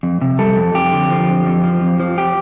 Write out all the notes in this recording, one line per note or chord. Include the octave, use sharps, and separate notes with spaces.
F2
C3
G3 A4
F2
F2 G4
D3
F3
F2
F2
F3
F2
F3
G4